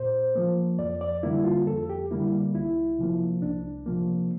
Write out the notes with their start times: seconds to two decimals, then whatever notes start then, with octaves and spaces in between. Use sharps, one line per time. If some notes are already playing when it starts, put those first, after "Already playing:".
Already playing: A#2 C5
0.35 F3 A#3
0.79 F2 D5
1.01 D5
1.23 D3 G3 A#3 E4
1.44 F4
1.67 F2 A4
1.89 G4
2.11 D3 G3 A#3 E4
2.54 C2 E4
2.99 C3 F3 A#3
3.42 C2 D4
3.86 C3 F3 A#3